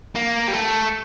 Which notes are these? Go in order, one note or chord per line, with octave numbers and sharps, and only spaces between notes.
A#3
G3
A3